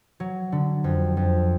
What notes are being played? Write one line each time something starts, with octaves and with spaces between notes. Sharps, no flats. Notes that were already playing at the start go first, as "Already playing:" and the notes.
F#3
D3
F2
F2